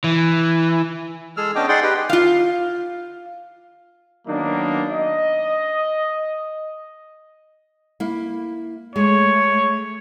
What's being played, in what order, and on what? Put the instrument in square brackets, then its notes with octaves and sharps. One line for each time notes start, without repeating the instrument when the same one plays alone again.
[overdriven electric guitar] E3
[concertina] G#3 G#4 A4 E6 F6
B3 C#4 D4 D#5 G5 D6
D#4 G#4 D5 F#5 G5 C6
G4 B4 D#5 G5
[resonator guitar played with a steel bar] F4 F5
[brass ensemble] D#3 F#3 A#3 B3 D4 D#4
D#5
[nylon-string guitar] A#3 E4
[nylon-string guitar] G#3 [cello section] A3 [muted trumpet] C#5